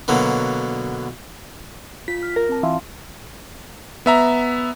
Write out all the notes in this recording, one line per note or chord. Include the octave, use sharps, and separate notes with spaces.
B2 D3 F#3 A#3
F4 B6
F6
A#4
C4 A5
E3 F4 F5 C6
B3 E5 A#5